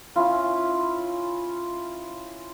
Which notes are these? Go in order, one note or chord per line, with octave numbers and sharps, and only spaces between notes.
C#4 E4 F4